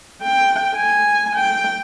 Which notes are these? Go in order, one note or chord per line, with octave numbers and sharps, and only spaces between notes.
G5
G#5
G5